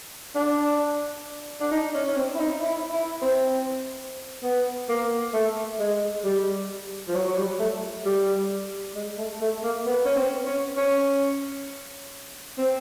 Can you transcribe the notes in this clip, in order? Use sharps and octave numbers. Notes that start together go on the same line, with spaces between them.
D4
D4
D#4
C#4
C#4
C4
E4
D#4
E4
E4
C4
B3
A#3
A3
G#3
G3
F3
F#3
F#3
G3
A3
G3
G#3
A3
A3
A#3
B3
C#4
C4
C#4
C#4
C4